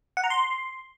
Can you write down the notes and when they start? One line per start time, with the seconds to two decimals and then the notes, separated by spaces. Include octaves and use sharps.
0.17 F#5
0.24 A#5
0.30 C6